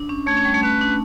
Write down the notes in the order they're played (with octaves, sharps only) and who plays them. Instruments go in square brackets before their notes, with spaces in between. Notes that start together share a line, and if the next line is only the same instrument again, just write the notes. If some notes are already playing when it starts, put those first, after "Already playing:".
Already playing: [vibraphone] D4
C#4
[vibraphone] A3 [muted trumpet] C#5
[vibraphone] C#4
G3
A3
[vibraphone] C#4 [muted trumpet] B4
[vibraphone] D4